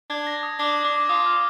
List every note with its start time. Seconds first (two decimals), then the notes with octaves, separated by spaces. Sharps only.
0.10 D4 G#6
0.27 A#6
0.43 D#6
0.59 D4 D6
0.85 D4 D6
1.09 F4 D#6
1.26 F6